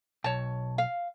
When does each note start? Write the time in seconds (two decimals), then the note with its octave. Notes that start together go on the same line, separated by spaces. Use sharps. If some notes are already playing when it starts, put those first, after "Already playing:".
0.24 B1 C#5 A5
0.78 F5